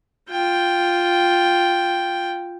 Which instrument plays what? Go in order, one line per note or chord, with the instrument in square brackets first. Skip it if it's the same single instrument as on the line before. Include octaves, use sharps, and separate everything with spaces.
[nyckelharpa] F4 G5